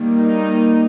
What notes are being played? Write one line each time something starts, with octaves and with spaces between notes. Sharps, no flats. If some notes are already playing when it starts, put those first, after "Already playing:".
Already playing: D#3 G3 A#3
D#4